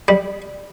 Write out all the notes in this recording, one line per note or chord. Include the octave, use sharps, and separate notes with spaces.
G3